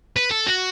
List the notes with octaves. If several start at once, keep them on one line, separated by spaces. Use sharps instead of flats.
B4
A4
F#4